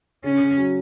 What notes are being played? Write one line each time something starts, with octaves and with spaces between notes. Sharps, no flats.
C#3 C#4
C#3
F#3